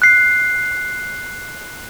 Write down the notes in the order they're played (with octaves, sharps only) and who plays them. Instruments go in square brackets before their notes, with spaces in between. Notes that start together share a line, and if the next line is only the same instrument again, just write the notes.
[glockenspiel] F#6 C7